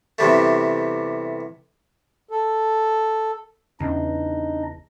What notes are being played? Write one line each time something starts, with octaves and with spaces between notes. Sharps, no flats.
E2 C3 G3 A3
A4
E2 C#3 D4 D#4 D#5